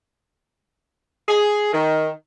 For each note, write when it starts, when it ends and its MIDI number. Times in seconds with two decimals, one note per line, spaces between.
1.28 1.71 68
1.73 2.08 51